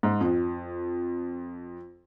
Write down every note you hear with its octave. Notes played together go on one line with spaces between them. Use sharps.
G#2
F2